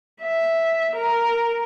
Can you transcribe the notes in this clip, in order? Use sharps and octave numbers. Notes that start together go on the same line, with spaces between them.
E5
A#4